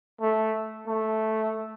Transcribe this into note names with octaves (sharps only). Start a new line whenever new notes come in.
A3
A3